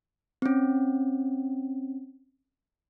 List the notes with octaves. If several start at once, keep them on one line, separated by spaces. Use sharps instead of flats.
C4 C#4